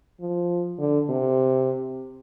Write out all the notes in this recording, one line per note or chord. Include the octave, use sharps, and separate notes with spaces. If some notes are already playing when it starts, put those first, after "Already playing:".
F3
D3
C3